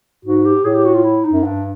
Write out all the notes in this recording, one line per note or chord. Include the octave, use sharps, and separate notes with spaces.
G#2 F#4
G4
A2 G#4
G4
F#4
F4
E4
D#4
F#2
G2 D4